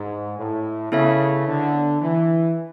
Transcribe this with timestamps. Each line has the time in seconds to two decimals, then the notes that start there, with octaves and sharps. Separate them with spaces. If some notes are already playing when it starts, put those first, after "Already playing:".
Already playing: G#2
0.38 A2
0.92 C#3 B3 E4 A4 C#5 E5
1.47 D3
2.01 E3